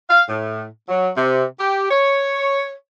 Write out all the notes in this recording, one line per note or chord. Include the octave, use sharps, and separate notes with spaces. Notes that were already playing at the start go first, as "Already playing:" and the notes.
F5
A2
F#3
C3
G4
C#5